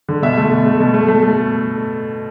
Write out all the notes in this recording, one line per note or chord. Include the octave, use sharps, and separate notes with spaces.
D3
B2 E5
A3
B2
A3
B2
A3
A3
A3